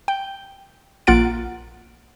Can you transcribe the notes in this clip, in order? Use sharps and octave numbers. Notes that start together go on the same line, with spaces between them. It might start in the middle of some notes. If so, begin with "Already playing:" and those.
G5
A#1 A#3 F4 F#5 A6 D7